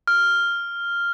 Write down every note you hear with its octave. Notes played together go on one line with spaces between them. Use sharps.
F6